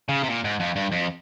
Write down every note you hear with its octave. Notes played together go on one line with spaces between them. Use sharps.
C#3
C3
A#2
G#2
F2
G2
F2